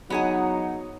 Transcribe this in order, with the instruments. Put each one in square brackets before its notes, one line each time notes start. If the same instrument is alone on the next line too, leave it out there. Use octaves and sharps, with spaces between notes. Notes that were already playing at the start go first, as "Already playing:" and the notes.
[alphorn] F#3 [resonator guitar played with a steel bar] B3 G#4 F#5 [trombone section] D#4